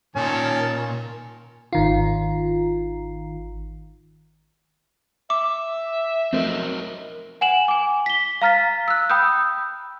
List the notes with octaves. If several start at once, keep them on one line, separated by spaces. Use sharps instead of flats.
A#2 D#3 C#4 C#5 A5
G#1 D#3 F4
E5 D6
F3 F#3 A3 C4 A#4 D#5
F#5 G#5 E7 F#7
G#5 D6
B6 G7
F5 A#5 F6 A6 B6
E6 F#6
G5 B5 D#6 E6 G6